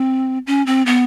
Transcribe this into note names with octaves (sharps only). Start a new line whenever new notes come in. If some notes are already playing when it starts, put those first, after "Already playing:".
Already playing: C4
C#4
C4
B3